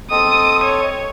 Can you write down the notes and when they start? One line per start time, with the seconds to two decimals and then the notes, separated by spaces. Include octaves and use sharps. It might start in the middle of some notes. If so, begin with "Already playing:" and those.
0.11 C4 A4 D#5 D#6
0.64 C#5